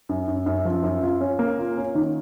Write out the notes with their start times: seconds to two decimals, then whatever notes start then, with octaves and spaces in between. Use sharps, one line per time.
0.09 F#2
0.28 F#2
0.46 F#2
0.65 F3
0.83 F#2
1.02 F4
1.21 C#4
1.39 A#3
1.58 F4
1.77 C#4
1.95 D#3